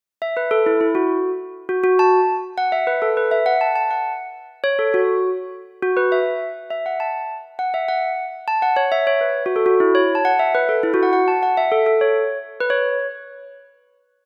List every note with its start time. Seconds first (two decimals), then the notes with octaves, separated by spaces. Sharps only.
0.22 E5
0.37 B4
0.51 A4
0.66 E4
0.81 E4
0.95 F#4
1.69 F#4
1.84 F#4
1.99 A5
2.58 F#5
2.72 E5
2.87 B4
3.02 A4
3.17 B4
3.31 E5
3.46 F#5
3.61 A5
3.75 A5
3.91 F#5
4.64 C#5
4.79 A4
4.94 F#4
5.83 F#4
5.97 B4
6.12 E5
6.71 E5
6.86 F#5
7.00 A5
7.59 F#5
7.74 E5
7.88 F#5
8.48 A5
8.62 F#5
8.76 C#5
8.92 E5
9.07 C#5
9.21 B4
9.46 F#4
9.56 A4
9.66 F#4
9.80 E4
9.95 C#5
10.15 A5
10.25 F#5
10.39 E5
10.55 B4
10.69 A4
10.83 E4
10.94 F#4
11.03 F#5
11.13 F#5
11.28 A5
11.43 F#5
11.57 E5
11.72 A4
11.86 A4
12.01 C#5
12.61 B4
12.70 C#5